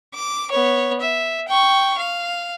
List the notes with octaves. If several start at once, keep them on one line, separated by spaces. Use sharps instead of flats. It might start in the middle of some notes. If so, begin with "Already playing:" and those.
D6
B3 C#5
E5
G5 C#6
F5